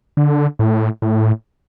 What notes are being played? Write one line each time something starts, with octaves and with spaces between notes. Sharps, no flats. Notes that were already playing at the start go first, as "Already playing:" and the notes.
D3
A2
A2